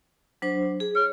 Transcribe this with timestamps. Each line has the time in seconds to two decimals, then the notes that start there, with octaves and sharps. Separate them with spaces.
0.42 F#3 D4 C5
0.80 G#4
0.95 C#5 F6